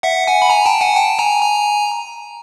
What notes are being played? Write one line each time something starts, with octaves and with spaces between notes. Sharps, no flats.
E5 F#5
F#5 G#5
B5
G#5 A#5
G5 A5
F#5 G#5
G5 A5
G#5 A#5
G#5 A#5